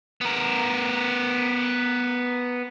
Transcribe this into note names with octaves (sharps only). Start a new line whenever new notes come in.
B3 A#4